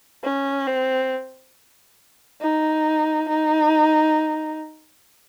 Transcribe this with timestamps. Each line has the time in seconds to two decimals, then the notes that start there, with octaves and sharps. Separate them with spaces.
0.24 C#4
0.67 C4
2.42 D#4
3.29 D#4